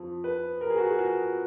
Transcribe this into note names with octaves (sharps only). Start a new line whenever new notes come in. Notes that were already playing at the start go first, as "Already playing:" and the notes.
Already playing: F2 F3
B4
A#4
G#4
F#4
G#4
F#4